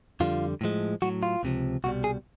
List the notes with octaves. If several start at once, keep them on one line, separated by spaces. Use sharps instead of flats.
F2 D3 G3 F4
A2 F3 G#3
A2 F#3 F#4
F4
C#2 C3 F3
C2 B2 G3 F#4
G#4